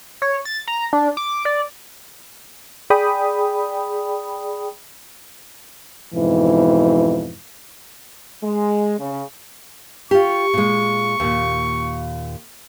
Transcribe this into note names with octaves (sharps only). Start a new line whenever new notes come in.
C#5
A6
A#5
D4
D6
D5
G#4 D5 G5 B5 D#6
F2 G#2 B2 E3
G#3
C#3
F4 G4 C#6
A#2 G#3
D#2 A#2